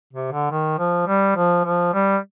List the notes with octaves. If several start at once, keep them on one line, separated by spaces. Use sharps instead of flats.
C3
D3
D#3
F3
G3
F3
F3
G3